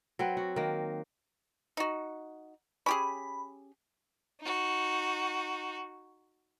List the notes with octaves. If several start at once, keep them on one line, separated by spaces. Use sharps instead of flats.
F#3 C4 B4
F#4
D#3 A#3
D#4 F#4
C#4 G4 G#4 B5
D#4 F#4